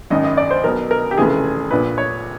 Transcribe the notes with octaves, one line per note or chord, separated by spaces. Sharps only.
G#1 F#2 D#3 D#5
D#5
D5
C5
B1 B2 A#4
A#4
G4
F1 D#2 C#3 E3 G#4
A#1 A#2 B4
C#5